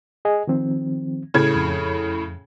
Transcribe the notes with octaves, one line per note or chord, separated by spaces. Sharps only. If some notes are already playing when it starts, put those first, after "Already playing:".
G#4 D#5 G#5
D#3 F3 C4
A2 C#3 G#6
F2